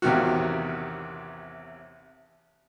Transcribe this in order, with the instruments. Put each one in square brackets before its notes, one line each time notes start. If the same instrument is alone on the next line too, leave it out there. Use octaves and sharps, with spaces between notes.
[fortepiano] A1 E2 C3 D#3 F4 F#4